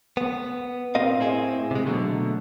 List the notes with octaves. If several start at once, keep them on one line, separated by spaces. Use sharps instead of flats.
B3
A#2 C4 A#4 D#5 F5
A2 C4 E4 G#4
C3 G#3
B2 D3 F#3 A3